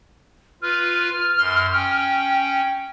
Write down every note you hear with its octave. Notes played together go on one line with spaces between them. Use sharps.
F4 B4 F6
F#2 C6
C#4 G5